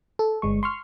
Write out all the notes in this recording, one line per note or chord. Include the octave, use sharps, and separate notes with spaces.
A4
G1 G#3 C#6
C6 C#6 F6